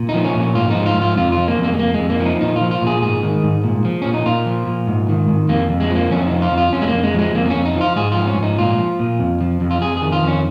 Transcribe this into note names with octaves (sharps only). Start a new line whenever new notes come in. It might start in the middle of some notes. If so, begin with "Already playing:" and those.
Already playing: A#2
D#4
F3
C#4
A#2 C#4
G#2 F4
D#4
F3
F4
G#2 F4
F2 F4
F3 F4
A#3
F2
A#3
G#3
F2 A#3
G#3
F2
A#3
F3
D#4
A#2 D#4
F4
F3
F4
A#2
G#4
G#2 G#4
D#3
G#2
A#2
F3
A#2 C#4
D#4
A#2 F4
F3
A#2
G#2
D#3
G#2
F2 A#3
F2
G#3
F3
A#3
F2 C#4
F3 D#4
F4
F2
F4
F2 C#4
G#3
A#3
F2
G#3
F3 G#3
F2 A#3
A#3
F2 C#4
D#4
F3
F4
G#2 G#4
F4
F3
C#4
G#2 D#4
A#2 F4
F3
A#2
F2
F3
F2
F4
F2 G#4
G#4
D#3
F4
F2 C#4